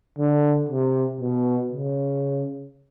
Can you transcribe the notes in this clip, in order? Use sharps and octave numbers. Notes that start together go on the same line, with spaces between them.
D3
C3
B2
C#3